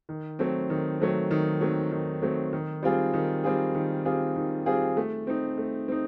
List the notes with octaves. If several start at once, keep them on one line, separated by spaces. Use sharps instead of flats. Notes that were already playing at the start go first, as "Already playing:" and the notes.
D#3
F#3 A3 C4
D#3
F#3 A3 C4
D#3
F#3 A3 C4
D#3
F#3 A3 C4
D#3
G3 C4 F4 G#4
D#3
G3 C4 F4 G#4
D#3
G3 C4 F4 G#4
D#3
G3 C4 F4 G#4
A3
C4 D#4
A3
C4 D#4